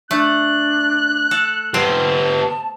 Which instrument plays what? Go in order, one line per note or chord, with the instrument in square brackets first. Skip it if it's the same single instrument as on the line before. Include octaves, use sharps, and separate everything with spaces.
[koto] A3 [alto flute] D4 [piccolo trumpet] F#6
[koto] A4
[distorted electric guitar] B3 G4 [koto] C4 [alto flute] A5